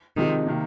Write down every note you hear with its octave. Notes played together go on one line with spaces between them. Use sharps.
C3 D#3 F3 G#3 C4 D#4
C3 D#3 A#3